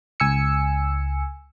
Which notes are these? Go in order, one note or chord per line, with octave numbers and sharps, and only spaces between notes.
C#2 G#5 E6 C#7